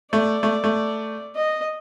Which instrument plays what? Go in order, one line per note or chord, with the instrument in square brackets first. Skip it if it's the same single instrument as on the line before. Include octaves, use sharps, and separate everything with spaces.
[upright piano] A3 [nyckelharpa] D5
[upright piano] A3
A3
[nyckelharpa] D#5